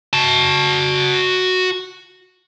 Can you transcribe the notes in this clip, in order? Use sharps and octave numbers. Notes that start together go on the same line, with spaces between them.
F#4 A5